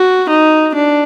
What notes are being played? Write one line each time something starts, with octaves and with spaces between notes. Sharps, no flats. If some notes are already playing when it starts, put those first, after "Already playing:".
Already playing: F#4
D#4
D4